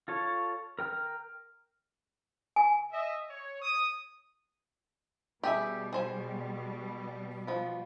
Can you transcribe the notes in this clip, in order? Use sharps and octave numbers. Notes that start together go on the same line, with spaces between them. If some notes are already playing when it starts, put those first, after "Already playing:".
F4 A4 C#5
A#4 G5 F6
G#5
D#5 E5
C#5
D#6
B2 G3 G4 G#4 E5
G#4 C5 G#5
F3 B3